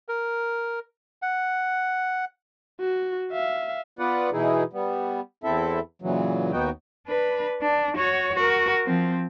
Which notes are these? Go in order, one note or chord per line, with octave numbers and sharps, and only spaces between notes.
A#4
F#5
F#4
E5 F5
B3 F4 B4 D5 F#5
B2 E3 D#4 E4 G#4
G3 B3
E2 C4 E4 A4 E5
A#2 C#3 E3 F#3
D#2 B3 D#4 F#4 G5
D4 B4
D4
F#4 C#5
F#4 A#4
F3 C4